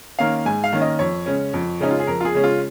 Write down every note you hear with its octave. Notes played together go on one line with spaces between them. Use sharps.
D#3 A#3 C#4 F5
G#2 G#5
F5
D#3 A#3 C#4
D#5
F2 C#5
C#3 G#3 C#4
F2
C#3 G#3 C#4 D#4
F4
G#4
F2 A#4
F4
G#4
C#3 G#3 C#4
F4